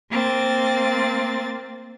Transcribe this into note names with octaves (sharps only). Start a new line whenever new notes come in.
A#3 C4 A6